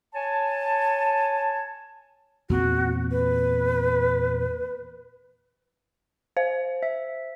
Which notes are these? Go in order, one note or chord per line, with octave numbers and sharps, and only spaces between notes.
C#5 G#5 A5
E2 A#2 C4 F#4
B4
C5 F5
E5